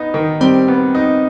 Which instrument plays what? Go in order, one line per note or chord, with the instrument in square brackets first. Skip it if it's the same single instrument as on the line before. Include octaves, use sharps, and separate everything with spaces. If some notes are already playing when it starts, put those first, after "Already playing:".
Already playing: [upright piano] B3 D#4
D#3
[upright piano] G3 [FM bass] C4
[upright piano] B3
D#4